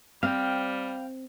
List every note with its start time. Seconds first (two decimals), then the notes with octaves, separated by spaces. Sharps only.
0.23 G3 C4 F5 G5